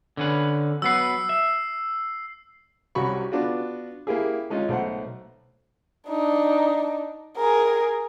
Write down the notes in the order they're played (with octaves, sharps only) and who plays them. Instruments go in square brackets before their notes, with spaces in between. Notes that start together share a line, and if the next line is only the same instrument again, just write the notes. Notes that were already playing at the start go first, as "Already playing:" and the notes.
[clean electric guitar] D3 C#4 B4
[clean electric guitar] F#3 B3 B4 [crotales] E6 C7
[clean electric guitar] E5
[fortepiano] C2 C3 C#4 F#4 B5 C#6
B3 D4 F4 F#4
A#3 E4 G4 G#4
G#3 C#4 D#4 F4
B1 A3 C5 F#5
[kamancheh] D4 D#4
G#4 A#4